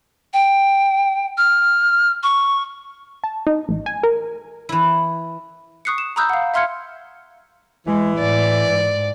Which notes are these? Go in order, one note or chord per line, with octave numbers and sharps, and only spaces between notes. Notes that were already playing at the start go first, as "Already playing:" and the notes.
G5
F6
C#6
A5
D#4
A1
G#5
A#4
E3 E4
C#6 D#6 F#6 C7 C#7
E7
A#5 B5 D#6 E6 F#6 G6
F5 F#5
E5 F5 C6 F6 G#6 C#7
E3 G#3
A2 D5
G#2